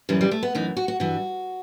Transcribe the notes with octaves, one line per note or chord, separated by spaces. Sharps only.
F#2 E3 G3
G3
A3
B3
F#2 E3 D#4
F#4
F#4
G2 E3 F#4